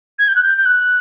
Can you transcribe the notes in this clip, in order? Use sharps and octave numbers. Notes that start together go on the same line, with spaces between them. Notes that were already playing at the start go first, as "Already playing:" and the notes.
G#6
G6
F#6
G6
G6
F#6